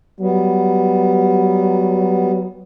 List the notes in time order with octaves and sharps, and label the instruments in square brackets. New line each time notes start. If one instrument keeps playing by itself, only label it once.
[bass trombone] F#3 [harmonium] G3 B3